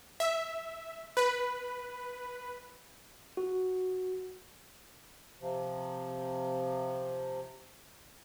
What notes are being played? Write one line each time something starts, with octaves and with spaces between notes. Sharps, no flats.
E5
B4
F#4
C3 F3